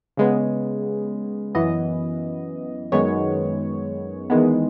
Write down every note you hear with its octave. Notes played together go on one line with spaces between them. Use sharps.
C#3 G#3 B3
F#2 E3 B3 D#5
F#2 D#3 G#3 B3 C#5
E2 D#3 G#3 B3